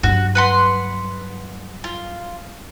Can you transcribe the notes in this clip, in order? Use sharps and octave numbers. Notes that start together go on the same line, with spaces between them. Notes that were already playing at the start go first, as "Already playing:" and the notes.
G2 F#3 F#4
B4 F#5 C6
F4